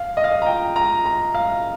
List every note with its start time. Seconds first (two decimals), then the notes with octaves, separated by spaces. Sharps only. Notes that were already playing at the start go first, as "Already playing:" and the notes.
Already playing: F5
0.17 D#5
0.24 F5
0.31 D#5
0.42 A#5
0.46 G5
0.76 A#5
1.06 A#5
1.34 F5